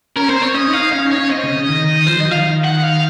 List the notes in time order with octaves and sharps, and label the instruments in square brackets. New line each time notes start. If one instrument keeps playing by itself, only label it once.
[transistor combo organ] C#4 [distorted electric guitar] A#4
[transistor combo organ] C4 [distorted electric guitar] C5
[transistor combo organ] C4 [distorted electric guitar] C#5
[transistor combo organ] C#4 [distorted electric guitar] D#5
[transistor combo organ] D#4
[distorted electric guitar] F5
[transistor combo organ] D#4
[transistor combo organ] C#4 [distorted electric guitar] F5
[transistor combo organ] D#4
[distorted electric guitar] C#5
[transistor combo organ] C#4
[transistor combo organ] C4 [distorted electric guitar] D#5
[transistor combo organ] C#3
C#3
D#3
[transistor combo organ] F3 [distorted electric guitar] C5
[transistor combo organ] D#3 F#3 [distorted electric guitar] D#5
[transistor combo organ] F3
[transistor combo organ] D#3 [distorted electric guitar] F5
[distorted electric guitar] F#5
F5